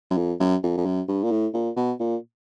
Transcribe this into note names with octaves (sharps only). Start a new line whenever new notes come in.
F#2
F2
F#2
F2
F2
F#2
G2
A#2
A2
A#2
B2
A#2